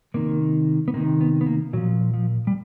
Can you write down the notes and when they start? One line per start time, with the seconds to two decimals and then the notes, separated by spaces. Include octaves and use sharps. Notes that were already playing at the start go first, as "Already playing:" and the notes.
0.14 C3 D#3 A#3
0.88 B3
0.94 C3 D#3 A#3
1.21 B3
1.41 B3
1.46 A#3
1.73 A#2 F3 F#3
2.14 F3
2.47 G3